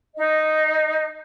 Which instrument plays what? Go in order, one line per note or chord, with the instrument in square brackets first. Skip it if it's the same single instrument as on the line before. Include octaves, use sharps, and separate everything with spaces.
[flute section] D#4 D#5